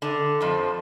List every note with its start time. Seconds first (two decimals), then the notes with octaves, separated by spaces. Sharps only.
0.02 D3
0.41 F2 F3